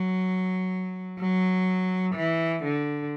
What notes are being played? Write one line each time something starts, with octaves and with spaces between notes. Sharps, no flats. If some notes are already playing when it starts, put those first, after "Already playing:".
Already playing: F#3
F#3
E3
D3